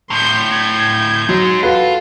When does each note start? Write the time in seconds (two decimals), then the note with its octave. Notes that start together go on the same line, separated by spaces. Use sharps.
0.10 D2 A2 C6 G6
0.51 G6 G#6
1.29 F#3 G#3 D#4
1.63 F4 F#4 A4 B4